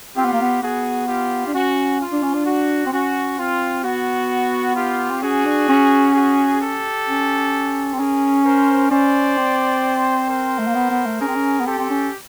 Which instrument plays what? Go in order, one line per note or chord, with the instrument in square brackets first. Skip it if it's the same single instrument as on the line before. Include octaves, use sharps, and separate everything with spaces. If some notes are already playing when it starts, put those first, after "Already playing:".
[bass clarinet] C4 [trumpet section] F4 G4
[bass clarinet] B3
A#3
B3
[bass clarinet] B3 [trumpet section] F#4 G#4
[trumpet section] F4 G4
[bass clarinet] D4
[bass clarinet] C#4 [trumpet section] F#4
[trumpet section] F4
[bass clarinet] D4
C#4
D4
[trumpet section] F#4
[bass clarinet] C4
[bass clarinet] C#4 [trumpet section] F#4
[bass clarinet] C4 [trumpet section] F4
[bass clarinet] B3 [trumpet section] F#4
[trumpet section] F4 G4
[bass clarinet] C4
[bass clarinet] C#4 [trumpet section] F#4 G#4
[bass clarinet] D4
C#4
[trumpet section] F#4 G#4
G4 A4
[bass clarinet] C#4
C4
[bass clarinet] C#4 [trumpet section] G#4 A#4
[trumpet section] A#4 C5
[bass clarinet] C#4 [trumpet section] C5 D5
[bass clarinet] C4
[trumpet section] A#4 C5
[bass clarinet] A3
A#3
B3
B3
A3
[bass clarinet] C#4 [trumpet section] G#4 A#4
[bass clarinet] C4
C#4
B3
[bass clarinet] C4 [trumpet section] G4 A4
[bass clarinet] C4
C#4